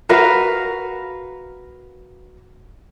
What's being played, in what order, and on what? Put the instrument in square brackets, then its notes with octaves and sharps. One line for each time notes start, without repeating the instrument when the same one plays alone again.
[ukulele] F#4 A#4 B4 F5